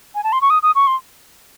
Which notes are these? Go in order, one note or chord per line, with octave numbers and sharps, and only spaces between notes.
G#5
A5
C6
C#6
D#6
D#6
C#6
C6